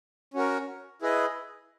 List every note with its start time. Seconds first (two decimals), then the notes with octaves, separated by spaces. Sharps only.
0.34 C#4 F#4 A#4
1.02 E4 G#4 B4 D#5